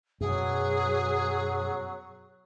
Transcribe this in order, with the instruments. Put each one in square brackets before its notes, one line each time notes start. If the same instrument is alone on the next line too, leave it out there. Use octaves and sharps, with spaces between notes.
[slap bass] F#2 B2 [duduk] F#3 [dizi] G#4